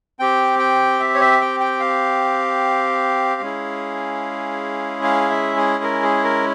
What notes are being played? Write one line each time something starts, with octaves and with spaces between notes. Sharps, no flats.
C4 G4 G5
G5
E5
C#5
E5
G5
G5
F5
G#3 C#4 E4 G#4
F5
E5
G#4
A#4
G#4
A#4